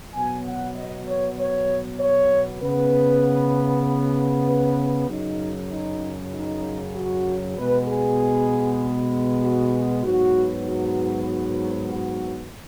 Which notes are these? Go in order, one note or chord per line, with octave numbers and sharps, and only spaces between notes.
B2 F#3 B3 G#5
F#5
D#5
C#5
C#5
C#5
C#3 B3 B4
B4
F#2 C#3 F#3 D#4
D#4
D#4
F#4
B2 G#3 B3 B4
G#4
F#4
G#2 F#3 B3 F#4
F#4
F#4
F#4